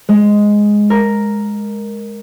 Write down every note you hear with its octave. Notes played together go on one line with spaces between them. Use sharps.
G#3
A#4